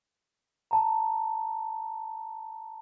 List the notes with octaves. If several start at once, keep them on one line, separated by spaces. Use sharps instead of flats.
A5 A#5